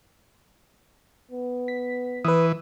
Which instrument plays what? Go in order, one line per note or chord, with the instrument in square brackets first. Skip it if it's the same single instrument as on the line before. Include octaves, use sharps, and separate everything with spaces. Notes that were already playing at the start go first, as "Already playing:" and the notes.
[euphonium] B3
[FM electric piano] B6
[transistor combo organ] E3 [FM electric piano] B4 D#6